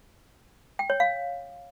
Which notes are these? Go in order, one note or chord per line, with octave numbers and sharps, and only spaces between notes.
G5
C#5
F5